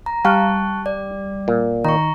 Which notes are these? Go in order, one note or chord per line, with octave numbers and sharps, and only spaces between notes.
A#5
G3 F5 A5 C#6 F#6
D5
A#2
D#3 A#5 C#6